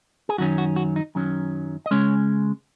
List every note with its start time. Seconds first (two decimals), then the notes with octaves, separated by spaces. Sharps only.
0.29 G#4
0.38 F#2 D#3 F#3 C#4 F#4
0.58 F#4
0.76 F#4
0.96 D#4
1.15 F#2 D#3 F#3 C#4
1.86 D#5
1.91 C#3 G#3 C#4 C#5